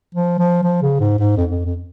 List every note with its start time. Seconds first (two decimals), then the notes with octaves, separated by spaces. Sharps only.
0.15 F3
0.39 F3
0.63 F3
0.82 C#3
1.00 G#2
1.19 G#2
1.37 F2
1.51 F2
1.65 F2